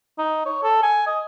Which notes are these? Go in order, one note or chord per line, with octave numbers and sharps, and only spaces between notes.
D#4
C#5
A4
G#5
D#5